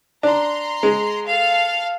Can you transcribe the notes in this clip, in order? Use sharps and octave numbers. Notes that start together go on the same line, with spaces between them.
D4 A#5 C6
G#3
A4 F5